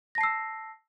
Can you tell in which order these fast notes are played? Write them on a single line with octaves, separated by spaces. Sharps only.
A#6 A5 C7 E6